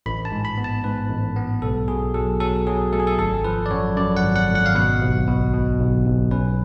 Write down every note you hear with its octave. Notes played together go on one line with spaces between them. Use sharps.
A1 B5
A5
G#2
B5
B3
A5
G#2 B4
A1
B3
B1 A4
B2 G#4
F#3 A4
F#3 A4
F#3 G#4
A3 A4
G#4
A4
G#1 A4
F3 B4
D5
F#2 C#5
F#2 D5
F#5
G#1
F#5
G#1
F#5
F5
B2 F#5
B1
B2
B2
B1
B1
C#4 B4